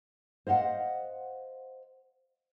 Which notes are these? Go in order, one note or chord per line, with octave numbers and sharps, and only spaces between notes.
C5 D#5 F5 F#5